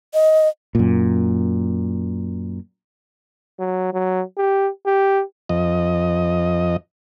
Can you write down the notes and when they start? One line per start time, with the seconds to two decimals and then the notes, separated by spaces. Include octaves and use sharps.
0.14 D#5
0.75 F#2 A#2
3.59 F#3
3.93 F#3
4.37 G4
4.86 G4
5.49 F2 D#5